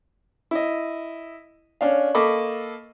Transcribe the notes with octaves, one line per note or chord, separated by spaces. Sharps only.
E4 D#5
C#4 D4 F5
A#3 A4 D#5 B5 C#6 D6